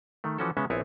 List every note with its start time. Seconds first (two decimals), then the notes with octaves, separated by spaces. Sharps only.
0.24 D#3 A3
0.38 E3 F3 C#4 F#4 A4
0.57 C#3 G#3 B3 C#4 E5
0.70 A#1 B3 C4 E4 C#5 G#5